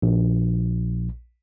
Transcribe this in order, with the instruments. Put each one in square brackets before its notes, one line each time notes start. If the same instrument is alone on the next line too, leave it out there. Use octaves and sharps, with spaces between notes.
[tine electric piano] A#1